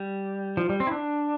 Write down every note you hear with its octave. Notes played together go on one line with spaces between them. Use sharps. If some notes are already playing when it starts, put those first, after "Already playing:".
Already playing: G3
F3
G3
C4
E4
D4